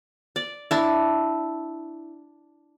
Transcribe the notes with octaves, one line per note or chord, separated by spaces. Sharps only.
D5
D4 E4